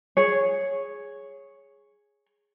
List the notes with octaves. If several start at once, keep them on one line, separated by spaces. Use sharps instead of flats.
G#4 C#5